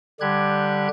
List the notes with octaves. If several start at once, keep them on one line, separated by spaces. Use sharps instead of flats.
D3 G3 G4 F#6 G#6